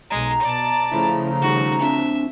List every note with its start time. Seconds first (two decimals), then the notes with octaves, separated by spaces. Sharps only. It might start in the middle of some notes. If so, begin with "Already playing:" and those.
0.10 B1 G#3 A#5
0.42 B2 D5 A5
0.92 C#3 F3 A3 E4
1.42 D#3 G3 F#4
1.81 C4 D4 E5 A5